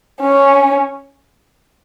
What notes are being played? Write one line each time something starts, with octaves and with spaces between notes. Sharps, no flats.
C#4